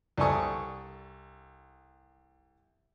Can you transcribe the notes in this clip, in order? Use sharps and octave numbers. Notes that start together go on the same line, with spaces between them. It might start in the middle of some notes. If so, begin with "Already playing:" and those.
C2 D4 A4 G#5 C#6 D#6